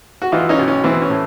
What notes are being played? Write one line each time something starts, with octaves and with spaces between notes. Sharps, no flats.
F#4
E3 D#4 F4
C#4 D#4
B1
C#4
E3 C4
C#4
A2